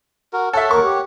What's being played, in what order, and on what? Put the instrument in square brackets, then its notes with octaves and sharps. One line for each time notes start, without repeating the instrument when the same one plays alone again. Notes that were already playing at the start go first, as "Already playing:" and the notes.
[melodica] F#4 A#4
[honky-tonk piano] A4 E5 [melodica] C#5 F#5
[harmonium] D#2 A#4 [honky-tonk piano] C#6
[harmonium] G4